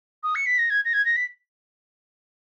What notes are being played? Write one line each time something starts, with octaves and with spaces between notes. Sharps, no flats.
D#6
C#7
B6
A#6
G#6
A#6
G#6
A#6
B6